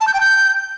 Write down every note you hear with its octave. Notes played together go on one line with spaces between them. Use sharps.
A5
G6
G5
G6